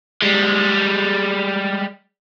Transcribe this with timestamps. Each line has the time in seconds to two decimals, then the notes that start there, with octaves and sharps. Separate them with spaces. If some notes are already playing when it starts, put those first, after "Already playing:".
0.22 G3 G#3